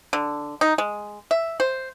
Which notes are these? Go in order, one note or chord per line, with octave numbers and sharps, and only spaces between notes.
D3
D#4
G#3
E5
C5